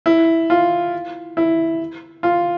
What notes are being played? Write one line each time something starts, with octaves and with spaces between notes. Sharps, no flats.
E4
F4
E4
F4